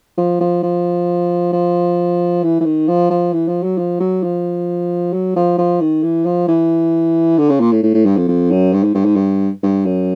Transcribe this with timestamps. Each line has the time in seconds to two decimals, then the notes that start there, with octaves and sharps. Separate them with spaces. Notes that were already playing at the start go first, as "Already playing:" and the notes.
0.17 F3
0.40 F3
0.63 F3
1.53 F3
2.43 E3
2.60 E3
2.65 D#3
2.88 F3
3.10 F3
3.33 E3
3.48 F3
3.63 F#3
3.78 F3
4.00 F#3
4.23 F3
5.13 F#3
5.36 F3
5.58 F3
5.80 D#3
6.03 E3
6.25 F3
6.48 E3
7.38 D3
7.50 C#3
7.60 A#2
7.72 A2
7.83 A2
7.94 A2
8.05 G2
8.17 F2
8.28 F2
8.51 F#2
8.73 G2
8.84 G#2
8.94 G2
9.05 G#2
9.16 G2
9.63 G2
9.85 F#2